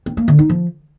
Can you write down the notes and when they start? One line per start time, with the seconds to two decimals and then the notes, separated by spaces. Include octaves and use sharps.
0.06 C4
0.17 A#3
0.28 D3
0.39 D#4
0.50 F3